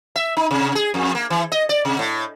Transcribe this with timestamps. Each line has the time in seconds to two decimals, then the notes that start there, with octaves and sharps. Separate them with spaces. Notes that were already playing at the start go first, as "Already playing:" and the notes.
0.16 E5
0.37 D#4
0.51 C3
0.75 G#4
0.94 F2
1.15 A#3
1.30 E3
1.52 D#5
1.69 D5
1.85 C3
1.99 A2